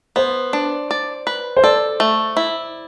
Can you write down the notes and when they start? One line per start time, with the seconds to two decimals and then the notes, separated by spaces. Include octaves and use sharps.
0.16 B3 C5
0.53 D4
0.91 D5
1.27 B4
1.57 C5
1.64 A4 D5
2.00 A3
2.37 E4